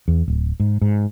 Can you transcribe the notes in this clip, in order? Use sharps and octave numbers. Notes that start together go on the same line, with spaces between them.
E2
D1
G#2
G#2